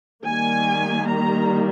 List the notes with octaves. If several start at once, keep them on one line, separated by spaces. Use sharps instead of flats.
D#3 G3 A#3 G#5
A#5